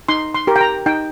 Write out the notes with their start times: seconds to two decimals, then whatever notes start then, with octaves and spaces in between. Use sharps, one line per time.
0.08 D#4 C6
0.35 C6
0.47 G4 A#4
0.56 G5
0.61 A#5
0.86 D#4 G5